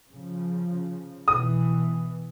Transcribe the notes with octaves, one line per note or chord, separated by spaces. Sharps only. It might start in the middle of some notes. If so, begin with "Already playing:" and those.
C#3 F3
B2 E3 D#6